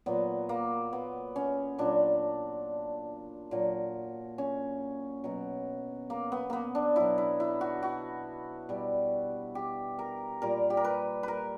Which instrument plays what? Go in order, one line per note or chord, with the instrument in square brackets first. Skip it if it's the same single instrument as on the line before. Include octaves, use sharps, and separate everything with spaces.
[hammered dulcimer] A#2 F#3 B3
A#3
B3
C#4
A#2 F#3 D4
A#2 F#3
C#4
B2 F#3
A#3
B3
A#3 B3
D4
B2 F#3 E4
E4
E4
F#4
F#4
B2 G3
G4
A#4
A#2 G3 A#4
G4
A#4
B4
A#4 B4